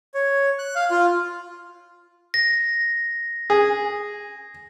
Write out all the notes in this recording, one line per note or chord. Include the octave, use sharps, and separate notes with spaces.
C#5
F#6
F5
F4
A#6
G#4